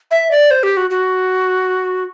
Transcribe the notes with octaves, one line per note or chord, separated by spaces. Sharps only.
E5
D5
C5
G4
F#4
F#4